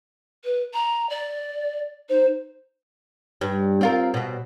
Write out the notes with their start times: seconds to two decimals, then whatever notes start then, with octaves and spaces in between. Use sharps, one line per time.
0.45 B4
0.74 A#5
1.10 D5
2.09 D#4 C5
3.41 G2
3.81 C4 F4 A#4
4.14 B2 C4